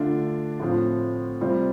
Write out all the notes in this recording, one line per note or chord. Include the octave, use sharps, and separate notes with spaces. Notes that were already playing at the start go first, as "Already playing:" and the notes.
Already playing: D3 A3 D4 F4
A2 F3 C4 F4
C3 G3 C4 F4